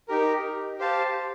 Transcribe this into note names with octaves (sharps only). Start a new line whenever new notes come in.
D#4 G4 A#4
G4 C5 F5 A5